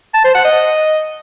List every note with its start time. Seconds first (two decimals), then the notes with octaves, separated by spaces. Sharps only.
0.14 A5
0.24 C5
0.35 F#5
0.45 D#5